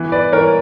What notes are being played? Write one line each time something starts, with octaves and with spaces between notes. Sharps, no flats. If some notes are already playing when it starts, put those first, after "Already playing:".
Already playing: E3 B3
B4 D5
E3 A#4 C#5